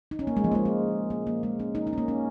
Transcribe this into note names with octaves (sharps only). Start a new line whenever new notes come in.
D#4
C#4
A#3
G#3
F3
A#3
G#3
G#3
A#3
A#3
G#3
C#4
D#4
D#4
C#4
A#3
C#4